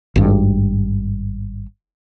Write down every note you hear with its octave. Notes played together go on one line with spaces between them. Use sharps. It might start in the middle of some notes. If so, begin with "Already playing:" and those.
G#1 G2